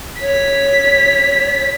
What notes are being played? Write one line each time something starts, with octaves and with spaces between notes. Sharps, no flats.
C#5 B6